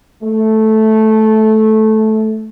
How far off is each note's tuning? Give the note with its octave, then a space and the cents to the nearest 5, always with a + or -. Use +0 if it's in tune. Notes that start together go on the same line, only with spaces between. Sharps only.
A3 -10